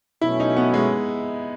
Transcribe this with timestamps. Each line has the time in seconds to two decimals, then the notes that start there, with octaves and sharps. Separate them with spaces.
0.21 B2 F#3 A3 C#4 E4
0.40 D#4
0.56 B3
0.74 G#3